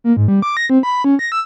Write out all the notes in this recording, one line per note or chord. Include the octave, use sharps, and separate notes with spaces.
A#3
G#2
G3
D6
A#6
C4
B5
C#4
A#6
E6